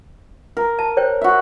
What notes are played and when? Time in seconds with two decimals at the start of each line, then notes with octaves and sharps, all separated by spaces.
0.57 A#4
0.79 A5
0.97 C5 C#5 G5
1.21 F#4 E5